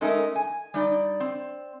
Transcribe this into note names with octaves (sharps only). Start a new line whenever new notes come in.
G#3 A3 C#4 D#4 A4 A#4
G#5
G3 D#4 D5
C4